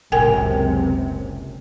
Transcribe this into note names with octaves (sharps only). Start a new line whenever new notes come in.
F#1 C#2 F#2 C3 A#4 G5 G#5